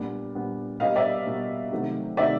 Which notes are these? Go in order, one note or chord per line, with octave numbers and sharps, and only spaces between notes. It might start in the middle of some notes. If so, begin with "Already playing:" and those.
Already playing: A#2 G3 B3 D4
A#2 G3 B3 D4
B2 G3 A#3 D#5 F5
D5 E5
B2 G3 A#3
C3 D#3 F#3 A3
C3 D#3 F#3 A3 D5 E5